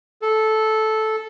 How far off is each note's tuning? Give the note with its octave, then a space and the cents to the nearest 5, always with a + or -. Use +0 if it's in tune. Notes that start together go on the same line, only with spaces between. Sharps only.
A4 -10